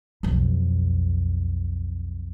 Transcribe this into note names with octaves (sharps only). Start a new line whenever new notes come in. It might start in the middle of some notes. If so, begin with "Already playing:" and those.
B1 F2